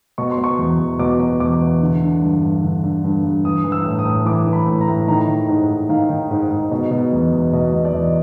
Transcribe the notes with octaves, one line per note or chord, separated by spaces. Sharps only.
B2 C#6
C6
B2
C#6
E2
E2
B2 D6
B2
E2 D6
E2
D3
D3
G2
G2
D3
D3
G2
G2
E3 D#6
E3
E6
A2
D#6
A2
E3 D6
E3
B5
A2
A#5
A2
D#3 A#5
D#3
G#2
G#2
D#3 F5
D#3
G#2
G#2
B2
B2
E2
E2
B2 D#5
B2
D5
E2 D#5